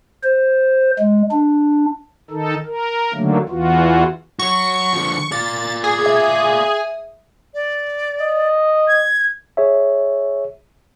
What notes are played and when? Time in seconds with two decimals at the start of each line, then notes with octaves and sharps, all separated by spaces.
0.23 C5
0.99 G#3
1.32 D4
2.31 D#3 D#4 A4
2.66 A#4
3.14 D3 D#3 F#3 A3 A#3
3.49 E2 E3 F4 F#4
4.39 F#4 C#5 C#6
4.93 D3 F3
5.32 F4 D5 A6
5.84 G#4
6.06 E5
7.54 D5
8.20 D#5
8.88 G#6
9.57 G#4 C#5 E5